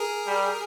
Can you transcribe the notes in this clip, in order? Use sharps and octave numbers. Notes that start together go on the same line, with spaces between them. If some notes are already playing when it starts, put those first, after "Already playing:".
Already playing: G#4 A#4
G3